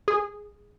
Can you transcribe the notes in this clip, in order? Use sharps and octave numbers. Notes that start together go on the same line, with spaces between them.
G#4